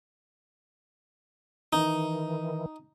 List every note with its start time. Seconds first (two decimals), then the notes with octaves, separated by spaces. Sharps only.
1.73 D#3 E3 D#4